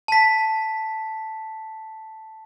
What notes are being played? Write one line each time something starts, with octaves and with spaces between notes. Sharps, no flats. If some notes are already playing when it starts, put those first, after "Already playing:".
A5 B6